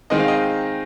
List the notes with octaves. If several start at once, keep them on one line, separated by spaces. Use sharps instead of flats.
D#3 G#3 C4 D#4 D#5
F5
D#5